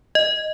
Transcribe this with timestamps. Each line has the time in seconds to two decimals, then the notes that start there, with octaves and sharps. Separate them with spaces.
0.15 D#5